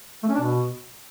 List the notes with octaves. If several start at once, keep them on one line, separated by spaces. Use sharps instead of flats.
A3
C#4
D4
B2